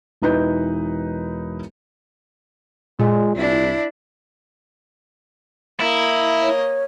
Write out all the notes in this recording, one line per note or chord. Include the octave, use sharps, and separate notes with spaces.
E1 E3 D#4 B4 G6
A#2 G#3
C2 D4 E4
A#3 E4 D#5
C#5